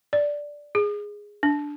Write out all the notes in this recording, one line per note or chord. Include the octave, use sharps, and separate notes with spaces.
D5
G#4
D4